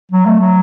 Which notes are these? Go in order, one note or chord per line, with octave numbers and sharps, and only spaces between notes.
F#3
A3
F#3